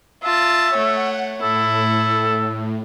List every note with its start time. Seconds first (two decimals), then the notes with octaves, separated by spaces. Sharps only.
0.23 F4 E5 A5
0.73 A3 C#5 F#5
1.42 A2 E4 A4